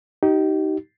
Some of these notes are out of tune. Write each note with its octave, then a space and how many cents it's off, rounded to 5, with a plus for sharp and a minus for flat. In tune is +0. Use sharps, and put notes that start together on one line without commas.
D#4 +10 G4 -30